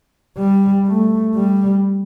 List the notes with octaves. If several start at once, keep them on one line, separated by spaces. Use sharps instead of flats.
G3
A3
G3